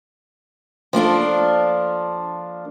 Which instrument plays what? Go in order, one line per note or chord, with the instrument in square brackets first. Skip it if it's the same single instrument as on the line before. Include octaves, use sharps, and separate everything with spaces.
[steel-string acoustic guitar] F3 A#3 D4 A4